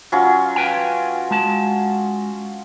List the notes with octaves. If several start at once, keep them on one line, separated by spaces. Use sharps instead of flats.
F#3 C#4 F4
B4 G5 G#5
G#3 A5